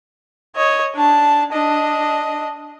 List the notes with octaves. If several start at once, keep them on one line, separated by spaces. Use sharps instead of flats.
C#5 D#5
D4 A5
D4 D#5